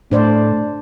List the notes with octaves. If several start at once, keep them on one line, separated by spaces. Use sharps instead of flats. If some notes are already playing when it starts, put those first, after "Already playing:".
A2 A3 D4 C5 D5